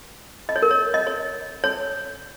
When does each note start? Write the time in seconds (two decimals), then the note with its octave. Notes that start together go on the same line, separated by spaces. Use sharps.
0.49 D#5
0.56 C#5
0.62 A#4
0.71 C#5
0.94 D#5
1.07 C#5
1.64 C#5